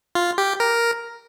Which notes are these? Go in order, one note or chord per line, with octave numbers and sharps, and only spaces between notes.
F4
G4
A#4